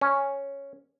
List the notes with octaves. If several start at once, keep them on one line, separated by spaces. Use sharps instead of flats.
C#4